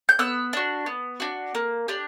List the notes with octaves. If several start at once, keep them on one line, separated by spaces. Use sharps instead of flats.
G6
B3 E6 F#6
D4 F#4
B3
D4 F#4
A#3
D4 G4